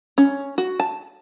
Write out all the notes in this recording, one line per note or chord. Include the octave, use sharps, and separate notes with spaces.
C#4
F#4
A5